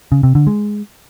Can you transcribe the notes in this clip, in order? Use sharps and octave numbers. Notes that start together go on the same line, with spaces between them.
C#3
C3
D3
G#3